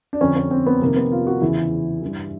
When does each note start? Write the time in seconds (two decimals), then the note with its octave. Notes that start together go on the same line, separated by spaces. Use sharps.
0.13 D4
0.21 F2 D3 C#4
0.36 C#4
0.51 C4
0.66 B3
0.81 F2 C3 D#3 A#3
0.96 B3
1.12 F4
1.27 F#4
1.42 E2 C#3 E3 E4
2.02 G2 E3